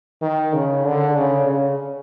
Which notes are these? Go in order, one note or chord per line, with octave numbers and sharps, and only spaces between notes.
D#3
C#3
D3
C#3
C#3